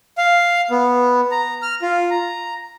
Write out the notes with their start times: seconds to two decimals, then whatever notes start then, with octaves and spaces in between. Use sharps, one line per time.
0.18 F5
0.71 B3
1.31 A#5
1.62 F6
1.82 F4
2.10 A#5